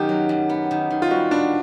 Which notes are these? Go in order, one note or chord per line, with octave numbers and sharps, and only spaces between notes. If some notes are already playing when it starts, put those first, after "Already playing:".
Already playing: F#2 D#3 G4
F#3
F#2
B3
D#3
D#3
F4
G3 F#4
B3 D4